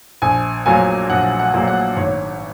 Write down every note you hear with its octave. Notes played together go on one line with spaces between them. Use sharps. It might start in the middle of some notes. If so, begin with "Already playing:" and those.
A#1 G#5
A#2 F#3 A#3 G#5
A#1 F#5
F#5
A#2 F#3 A#3
F#5
G#1 C#5